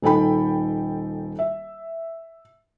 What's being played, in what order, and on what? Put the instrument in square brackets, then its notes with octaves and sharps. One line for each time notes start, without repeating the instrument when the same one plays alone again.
[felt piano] D#1 D#4 A4 G5 B5
E5